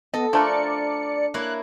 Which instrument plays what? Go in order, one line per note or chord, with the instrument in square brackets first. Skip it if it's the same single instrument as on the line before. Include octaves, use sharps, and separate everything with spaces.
[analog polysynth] B3 [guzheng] A4 [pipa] D#5
[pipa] F3 A3 A#4 [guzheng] D4 [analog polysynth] D5 C#7
[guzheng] A#3 E4 C#5 [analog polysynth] F#6